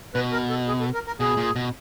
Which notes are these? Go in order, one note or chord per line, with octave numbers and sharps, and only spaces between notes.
B2 B4
A#4
A4
G#4
A4
A#4
A#4
B2 G#4
A#2
B2